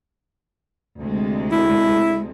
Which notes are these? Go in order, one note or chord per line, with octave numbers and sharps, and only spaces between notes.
D2 C3 G#3
E4